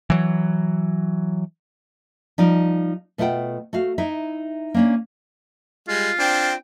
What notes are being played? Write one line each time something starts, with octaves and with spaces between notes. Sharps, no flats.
E3 F#3
F3 G3 D#4 D5
B2 A3 F4 F#5 G5
A3 F#4 F5
D#4 E4 E5
A#3 C#4 D4
G3 G#3 F4
C4 D4 G5